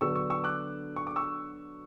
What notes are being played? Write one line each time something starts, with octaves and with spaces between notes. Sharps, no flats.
D3 F#3 B3 D4 C#6 E6
C#6 E6
C#6 E6
D6 F#6
C#6
D6
C#6 E6